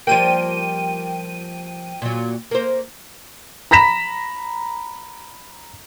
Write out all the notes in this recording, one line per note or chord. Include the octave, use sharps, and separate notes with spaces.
F3 G3 A#3 G5 D#7
A#2 F#3
A#3 C5
A#5 B5 A#6 B6 E7